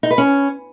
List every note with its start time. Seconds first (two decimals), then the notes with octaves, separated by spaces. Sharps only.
0.03 D#4
0.11 B4
0.18 C#4